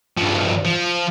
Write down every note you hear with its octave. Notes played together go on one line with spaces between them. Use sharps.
G2 F3
F3